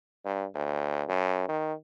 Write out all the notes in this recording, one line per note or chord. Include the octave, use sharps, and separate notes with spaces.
G2
D2
F#2
D#3